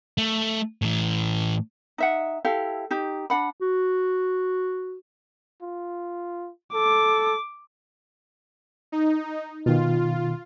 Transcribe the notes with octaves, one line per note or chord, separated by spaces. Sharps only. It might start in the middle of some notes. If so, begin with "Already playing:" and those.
A3
A2 E3
D#4 E5 F#5
E4 G4 A4 F5
D#4 G4
D4 F#5 B5
F#4
F4
A4 D6
D#4
B2 D#3 F4